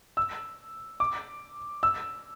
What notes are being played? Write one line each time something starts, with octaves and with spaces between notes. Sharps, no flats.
E6
D6
E6